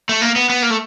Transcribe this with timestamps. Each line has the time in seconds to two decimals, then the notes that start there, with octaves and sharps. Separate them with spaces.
0.09 A3
0.22 A#3
0.36 B3
0.50 B3
0.62 A#3
0.70 A3